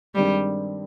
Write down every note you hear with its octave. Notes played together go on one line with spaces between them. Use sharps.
G2 D#3 G3 G#3 C4 G4